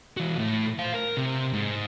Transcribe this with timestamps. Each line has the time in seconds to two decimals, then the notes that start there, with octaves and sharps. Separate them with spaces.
0.17 E3 F#4
0.39 A2
0.79 C5 F5
0.94 A#4
1.17 C3
1.53 G#2